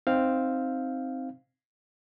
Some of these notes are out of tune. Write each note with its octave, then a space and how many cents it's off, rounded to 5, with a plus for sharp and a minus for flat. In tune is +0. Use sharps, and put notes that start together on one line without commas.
C4 +0 D#4 +0 F5 +0